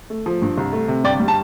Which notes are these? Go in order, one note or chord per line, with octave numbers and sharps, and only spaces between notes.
A3
F3
G2
C2
A3
C3
G1 D5 G5
G3
A5